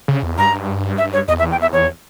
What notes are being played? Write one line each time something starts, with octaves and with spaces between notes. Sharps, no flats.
C#3
E2
G2 A#5
E5
C#5
E2 D#5
E5
G5
E5
E2 C#5